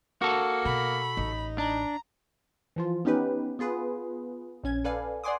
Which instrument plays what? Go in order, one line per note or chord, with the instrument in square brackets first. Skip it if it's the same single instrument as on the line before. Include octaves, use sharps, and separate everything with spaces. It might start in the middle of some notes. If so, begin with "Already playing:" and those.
[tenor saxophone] A#3 [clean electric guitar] F#4 A4
[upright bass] B2 [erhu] B5
[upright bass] A1 [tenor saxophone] D#4
[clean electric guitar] D4 [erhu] A#5
[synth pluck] E3 F3 F4
B3 C#4 D#4 G4 B4
B3 F4 G#4 B4
A#1 C#4 G#6
A4 B4 D5 F5 G#5
D5 F#5 G#5 C6 D6 D#6